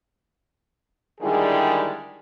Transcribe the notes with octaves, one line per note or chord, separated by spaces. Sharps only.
D3 D#3 G3 G#3 E4 G#4